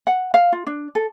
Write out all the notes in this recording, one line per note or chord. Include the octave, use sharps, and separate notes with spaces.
F#5
F5
F4
D4
A4